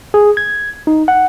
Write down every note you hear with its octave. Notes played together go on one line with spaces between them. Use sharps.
G#4
G#6
D#4
F#5